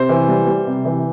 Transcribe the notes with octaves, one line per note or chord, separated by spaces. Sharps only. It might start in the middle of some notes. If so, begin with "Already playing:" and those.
Already playing: C3 C5
E3
G3
G3
C3
E3